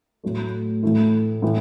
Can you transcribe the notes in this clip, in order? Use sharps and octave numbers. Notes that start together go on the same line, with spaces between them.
A2 F#3 A3
A2 E3 A3 E4
A2 E3 A3